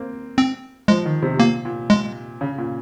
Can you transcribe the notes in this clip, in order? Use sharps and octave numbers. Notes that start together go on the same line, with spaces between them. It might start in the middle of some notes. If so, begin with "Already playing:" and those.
Already playing: A#3 C4
C4
F3 G#3
D#3
C3
A#2 A#3
A#2
G#3
C#3
A#2